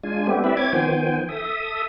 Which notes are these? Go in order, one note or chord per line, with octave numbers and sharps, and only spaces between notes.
G#3 D4 F4 G#5
G3 A3 B3 C4 G4
C4 E4 B4 D5 E5
C4 C#5 D6 G#6
D#3 F3 B3 C5 G5 G#5
A4 E5 D#6